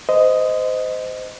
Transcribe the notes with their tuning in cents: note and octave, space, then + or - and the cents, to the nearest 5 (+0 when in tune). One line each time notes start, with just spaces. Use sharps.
C5 -25 D#5 +0